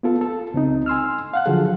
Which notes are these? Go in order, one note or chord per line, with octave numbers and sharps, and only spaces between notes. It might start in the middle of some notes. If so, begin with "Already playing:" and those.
B3 F4 A4
A4
C#2 C4 D#4
G#5 C6 E6 F6
F5 F#5 F#6
D3 F3 F#3 G#4 A4